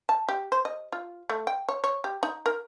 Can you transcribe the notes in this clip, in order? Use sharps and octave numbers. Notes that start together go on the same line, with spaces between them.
A5
G4
C5
D#5
F4
A3
G5
C#5
C#5
G4
D#4
A#4